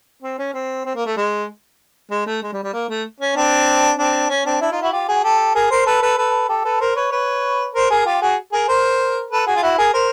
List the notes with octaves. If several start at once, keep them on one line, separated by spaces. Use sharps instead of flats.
C4
C#4
C4
C4
A#3
A3
G#3
G#3
A3
G#3
G3
G3
A#3
A3
C#4
C4 D4
C4 D4
C#4
C4 D4
D4 E4
D#4 F4
E4 F#4
F4 G4
F#4 G#4
G4 A4
G#4 A#4
A#4 C5
A4 B4
A4 B4
A4 B4
G4 A4
A4 B4
A#4 C5
B4 C#5
B4 C#5
A#4 C5
G#4 A#4
F4 G4
F#4 G#4
G#4 A#4
A#4 C5
A4 B4
F#4 G#4
F4
E4 F#4
G#4 A#4
A#4 C5